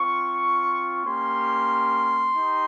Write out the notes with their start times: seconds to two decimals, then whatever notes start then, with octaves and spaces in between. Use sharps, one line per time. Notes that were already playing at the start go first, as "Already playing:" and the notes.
Already playing: C4 F4 C#6
1.04 A#3 C#4 G4 C6
2.36 D#4 G4